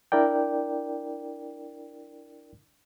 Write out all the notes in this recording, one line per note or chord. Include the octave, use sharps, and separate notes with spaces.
D4 E4 A#4 D5 G5